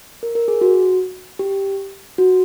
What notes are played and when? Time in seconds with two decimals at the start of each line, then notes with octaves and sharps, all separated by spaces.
0.23 A#4
0.35 A#4
0.48 G#4
0.61 F#4
1.39 G4
2.18 F#4